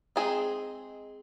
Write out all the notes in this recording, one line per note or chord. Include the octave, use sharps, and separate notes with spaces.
G#3 C4 D#4 G#4